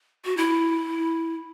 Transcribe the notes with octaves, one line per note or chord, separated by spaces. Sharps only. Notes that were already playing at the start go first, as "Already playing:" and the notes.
F#4
E4